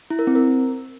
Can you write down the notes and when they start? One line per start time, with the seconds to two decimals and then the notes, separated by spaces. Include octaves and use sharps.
0.10 E4
0.19 A#4
0.27 C4
0.35 A#4